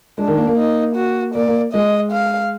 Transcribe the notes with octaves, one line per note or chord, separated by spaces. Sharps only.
G#3 D4
D#3
A#3
A#3
D#4
F#4
A#3 D5
A#3
G#3 D#5
F5